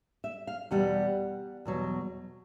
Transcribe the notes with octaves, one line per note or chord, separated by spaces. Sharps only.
E5
F5
E2 B2 G3 F#5
E2 B2 F#3